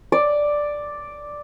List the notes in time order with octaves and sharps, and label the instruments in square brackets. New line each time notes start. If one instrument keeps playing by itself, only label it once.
[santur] D5